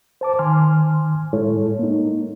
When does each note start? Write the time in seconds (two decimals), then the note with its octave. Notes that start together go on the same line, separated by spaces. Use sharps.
0.21 C5 A5 D6
0.39 D#3 G#5 C6 F6
1.33 A2 G#3 E4 A4 C#5
1.79 A#3 D#4